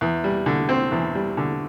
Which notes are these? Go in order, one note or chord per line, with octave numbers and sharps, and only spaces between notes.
E2
G3
D3
C4
E2
G3
D3